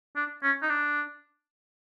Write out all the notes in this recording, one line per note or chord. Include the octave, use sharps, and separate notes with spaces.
D4
C#4
D#4
D4